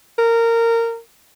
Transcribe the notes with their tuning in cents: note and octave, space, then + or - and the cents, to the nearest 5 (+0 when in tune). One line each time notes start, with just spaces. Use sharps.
A#4 -20